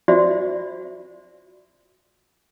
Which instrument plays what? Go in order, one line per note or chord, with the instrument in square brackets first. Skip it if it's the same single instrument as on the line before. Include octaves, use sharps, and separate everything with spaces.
[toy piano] F4 F#4 C5 D5 E5